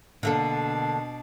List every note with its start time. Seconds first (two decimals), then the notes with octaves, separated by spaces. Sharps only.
0.23 B2 D3 A#3 D4 A4